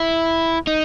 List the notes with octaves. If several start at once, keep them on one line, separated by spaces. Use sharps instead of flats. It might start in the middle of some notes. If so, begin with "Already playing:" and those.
Already playing: E4
D#4